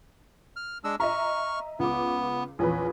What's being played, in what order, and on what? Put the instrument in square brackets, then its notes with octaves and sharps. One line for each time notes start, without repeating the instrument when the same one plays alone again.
[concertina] F6
G#3 D4 E6
[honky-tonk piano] D#5 E5 A#5 [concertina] C#6 F6
[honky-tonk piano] C#2 D6 [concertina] B3
[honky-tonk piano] A#1 E2 B4 [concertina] C#4